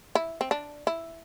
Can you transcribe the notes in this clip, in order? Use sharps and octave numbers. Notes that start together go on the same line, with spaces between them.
E4
C4
D4
E4